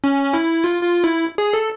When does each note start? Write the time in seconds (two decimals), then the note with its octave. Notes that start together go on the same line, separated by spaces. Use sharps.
0.04 C#4
0.33 E4
0.64 F4
0.83 F4
1.04 E4
1.38 G#4
1.53 A4